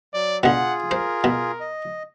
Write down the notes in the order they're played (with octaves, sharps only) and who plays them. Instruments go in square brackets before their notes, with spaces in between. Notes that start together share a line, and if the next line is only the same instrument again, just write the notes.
[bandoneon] F#3 [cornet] D5
[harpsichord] B2 D3 [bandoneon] F4 G#4 [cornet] F#5
[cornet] A#4 [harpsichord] C5
[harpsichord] B2
[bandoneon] D#5